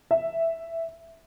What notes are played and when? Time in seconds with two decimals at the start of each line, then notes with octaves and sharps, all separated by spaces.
0.11 E5